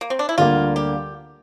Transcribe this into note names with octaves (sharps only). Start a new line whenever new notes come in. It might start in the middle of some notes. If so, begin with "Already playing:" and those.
A#3
C4
D4
E4
D2 D3 G3 A#3 F4
G4